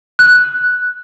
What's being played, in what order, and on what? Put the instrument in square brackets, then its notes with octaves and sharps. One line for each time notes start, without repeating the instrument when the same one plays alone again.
[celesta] F#6